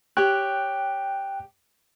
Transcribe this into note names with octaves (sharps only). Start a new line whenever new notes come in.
G4 C#5 G5 F#6